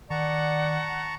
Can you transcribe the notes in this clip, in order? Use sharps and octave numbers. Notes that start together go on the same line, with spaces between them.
D#3 D5 F#5 A5 A#5 C#6